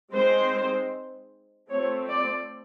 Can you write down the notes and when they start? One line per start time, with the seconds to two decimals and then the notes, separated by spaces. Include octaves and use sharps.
0.13 G#3 C4 D#4 C5
1.70 A3 C4 F4 C#5
2.09 D5